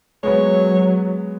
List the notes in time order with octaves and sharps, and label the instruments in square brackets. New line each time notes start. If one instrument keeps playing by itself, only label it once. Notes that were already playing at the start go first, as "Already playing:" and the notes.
[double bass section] F#3 [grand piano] G#3 B3 [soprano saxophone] C#5